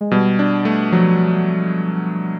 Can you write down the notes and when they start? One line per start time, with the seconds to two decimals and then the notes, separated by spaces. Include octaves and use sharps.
0.01 G#3
0.11 B2 G3
0.39 D4
0.65 A3
0.92 F3 F#3